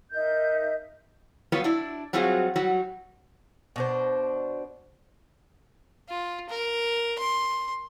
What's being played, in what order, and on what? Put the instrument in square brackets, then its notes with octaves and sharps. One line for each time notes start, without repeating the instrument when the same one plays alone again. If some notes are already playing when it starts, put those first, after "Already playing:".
[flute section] D#4 A#4 E5 G6
[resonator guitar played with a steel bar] F#3 G3 B3 F4 B4 C#5
D4 E4
F#3 G3 C4 F4 F#4 G#4
F#3 G3 F#4
[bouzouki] B2 D4 C5
[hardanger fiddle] F4
A#4
C6